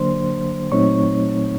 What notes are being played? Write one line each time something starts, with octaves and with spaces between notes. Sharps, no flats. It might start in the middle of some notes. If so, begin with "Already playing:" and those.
Already playing: D3 F#3 A#3 D4 C5 C6
A#2 F#3 A3 C4 D#4 C#5 C#6